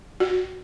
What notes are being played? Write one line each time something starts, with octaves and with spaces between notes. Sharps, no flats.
F#4